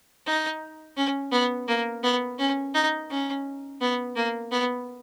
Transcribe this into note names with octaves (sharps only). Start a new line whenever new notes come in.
D#4
C#4
B3
A#3
B3
C#4
D#4
C#4
B3
A#3
B3